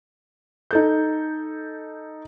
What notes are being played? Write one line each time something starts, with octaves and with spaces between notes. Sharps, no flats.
D#4 A4 G6